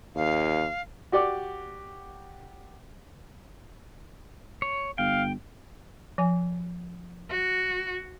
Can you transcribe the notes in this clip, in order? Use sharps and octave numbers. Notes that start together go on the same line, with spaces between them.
D#2 F5
F#4 G4 D5 F#5 D6
C#5
G1 F5 G5
F3 G#5
F#4